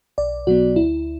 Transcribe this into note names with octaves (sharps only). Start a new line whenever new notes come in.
B1 D5
B2 F#3 B3 F#4
D2 E4